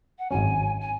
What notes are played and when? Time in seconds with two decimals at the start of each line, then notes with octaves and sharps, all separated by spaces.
0.19 F#5
0.30 G#1 G#2 F#3 C#4 G#5
0.81 G#5